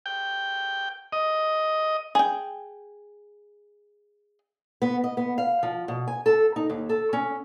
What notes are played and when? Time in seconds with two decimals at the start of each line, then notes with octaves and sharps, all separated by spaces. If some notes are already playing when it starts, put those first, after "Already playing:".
0.06 G5
1.12 D#5
2.15 G#4 G5
4.82 B3
5.04 D#5
5.17 B3
5.38 F5
5.63 F3
5.88 B2
6.07 G#5
6.26 A4
6.56 D#4
6.70 D#2
6.89 A4
7.13 C#4